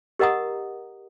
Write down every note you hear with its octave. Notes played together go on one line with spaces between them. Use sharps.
G4 A#4 D#5 F#5 A#5 D#6